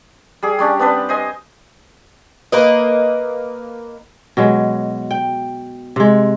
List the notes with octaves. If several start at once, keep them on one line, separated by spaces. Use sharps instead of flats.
G3 G#4
G3 C#4 D4 G4
B3 C4 D4 B4
C5 D#5 G#5
A#3 A#4 B4 D#5
B2 F#3 G#3
G5
C3 G#3